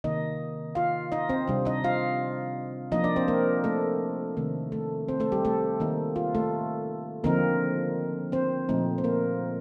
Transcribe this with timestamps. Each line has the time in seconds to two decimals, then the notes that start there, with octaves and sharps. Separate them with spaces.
0.04 C3 D#3 A#3 D#4 D#5
0.75 F4 F5
1.12 D#4 D#5
1.29 C4 C5
1.48 C3 G3 D4
1.65 D#4 D#5
1.84 F4 F5
2.92 F3 A#3 D4 D#4 D#5
3.04 D4 D5
3.16 C4 C5
3.28 A#3 A#4
3.64 A3 A4
4.37 C3 D#3 A3
4.72 A3 A4
5.09 C4 C5
5.20 A3 A4
5.32 G3 G4
5.45 A3 A4
5.80 D#3 A#3 D#4
6.16 F4
6.35 A3 A4
7.24 D3 F3 A#3 C4 D#4 A#4
8.32 C4 C5
8.69 A#2 F3 A3 C4 D#4
8.98 C5
9.04 A#3 A#4